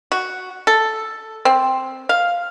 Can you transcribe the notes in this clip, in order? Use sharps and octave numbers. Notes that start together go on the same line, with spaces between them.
F#4
A4
C4
F5